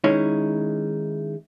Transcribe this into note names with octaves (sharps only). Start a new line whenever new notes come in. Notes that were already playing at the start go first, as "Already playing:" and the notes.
D#3 G#3 C#4 D#4 E4 C#5